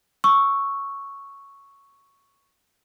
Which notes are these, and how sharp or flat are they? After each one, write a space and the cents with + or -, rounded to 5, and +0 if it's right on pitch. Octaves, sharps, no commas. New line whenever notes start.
C#6 +0 E6 +0